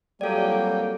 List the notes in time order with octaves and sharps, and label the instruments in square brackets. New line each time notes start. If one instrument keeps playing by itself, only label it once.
[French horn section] F2 G3 [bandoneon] F#3 A#3 [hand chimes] A4 D5 [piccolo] G5